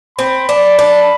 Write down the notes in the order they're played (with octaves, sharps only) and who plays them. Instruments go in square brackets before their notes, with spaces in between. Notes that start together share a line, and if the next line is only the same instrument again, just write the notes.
[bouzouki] C4 [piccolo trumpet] B5
[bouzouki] D4
D4